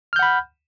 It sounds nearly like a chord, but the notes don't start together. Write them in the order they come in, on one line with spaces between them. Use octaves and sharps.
F6 G6 F#5 B5